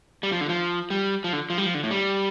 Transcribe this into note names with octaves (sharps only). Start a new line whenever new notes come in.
G3
F3
D3
F3
G3
F3
D3
F3
G3
F3
D3
A2
G3